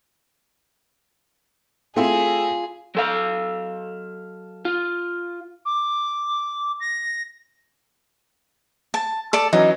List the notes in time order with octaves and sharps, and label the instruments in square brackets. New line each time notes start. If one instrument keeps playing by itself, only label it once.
[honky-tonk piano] A3 C4 E4 [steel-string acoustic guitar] F4 [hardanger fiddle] G#4
[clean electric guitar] F#3 A4 F5
F4
[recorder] D6
A#6
[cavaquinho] A5
A4 D5 A5
[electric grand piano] E3 F#3 C#4 [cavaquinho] D#4